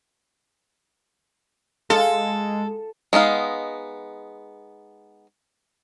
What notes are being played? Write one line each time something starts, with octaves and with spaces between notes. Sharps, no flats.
G#3 F4 A4
G#3 B3 D#4 F5